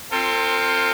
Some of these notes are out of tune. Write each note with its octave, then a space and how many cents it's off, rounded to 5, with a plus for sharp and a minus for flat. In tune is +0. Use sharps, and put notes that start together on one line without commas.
C4 +15 F4 +0 A4 +45